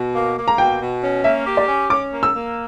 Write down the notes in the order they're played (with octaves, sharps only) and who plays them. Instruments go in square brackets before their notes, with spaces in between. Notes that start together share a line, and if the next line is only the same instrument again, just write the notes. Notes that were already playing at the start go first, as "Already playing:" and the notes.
Already playing: [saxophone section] B2
A#3
A#3
[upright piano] A#5
[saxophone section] B2 [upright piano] G5
[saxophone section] B2
C#4
[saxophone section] A#3 [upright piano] E5
[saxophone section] G4
[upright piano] D5
[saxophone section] C#4
[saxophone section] C#4 [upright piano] D6
[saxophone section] A#3
[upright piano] E6
[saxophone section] A#3